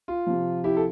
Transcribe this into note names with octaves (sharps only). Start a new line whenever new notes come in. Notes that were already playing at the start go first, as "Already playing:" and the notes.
F4
C3 F3
E4 G4
A4